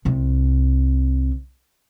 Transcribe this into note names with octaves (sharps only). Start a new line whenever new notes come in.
C2 C3